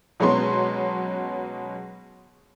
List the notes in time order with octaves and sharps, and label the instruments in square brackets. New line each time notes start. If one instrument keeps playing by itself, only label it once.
[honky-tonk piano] B2 F#3 G#3 B3 C#4 C6